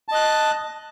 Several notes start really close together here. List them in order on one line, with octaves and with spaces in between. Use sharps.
A5 D#5 F#6